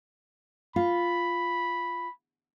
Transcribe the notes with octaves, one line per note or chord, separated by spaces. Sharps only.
F4 B5